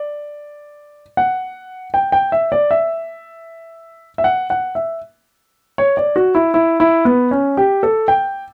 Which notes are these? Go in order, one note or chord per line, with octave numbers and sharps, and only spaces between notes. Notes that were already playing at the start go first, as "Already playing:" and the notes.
Already playing: D5
F#5
G5
G5
E5
D5
E5
E5
F#5
F#5
E5
C#5
D5
F#4
E4
E4
E4
B3
C#4
G4
A4
G5